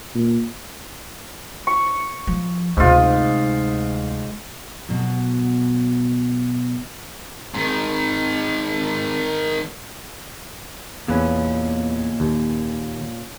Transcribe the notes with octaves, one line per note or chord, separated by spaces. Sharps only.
A#2
C#6
F3
D2 G#2 C3 F4
B2 F#3
G#2 D#3
E2 A#2 C#4 B4
D#2